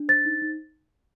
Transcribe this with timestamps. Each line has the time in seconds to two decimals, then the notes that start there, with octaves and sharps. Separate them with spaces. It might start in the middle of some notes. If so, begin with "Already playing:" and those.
Already playing: D4
0.09 C5 A6
0.25 D#4
0.42 D#4